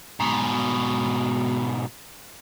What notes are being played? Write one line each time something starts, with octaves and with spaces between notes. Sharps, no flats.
G#2 B2